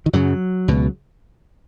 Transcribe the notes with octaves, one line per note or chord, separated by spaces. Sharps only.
D#3
F#2 C#3 F#3
C#2 B2